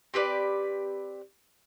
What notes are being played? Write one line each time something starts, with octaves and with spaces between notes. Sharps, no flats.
C4 G4 B4 D5